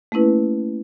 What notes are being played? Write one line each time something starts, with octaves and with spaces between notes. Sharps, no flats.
A3 A#3 C#4 E4 B4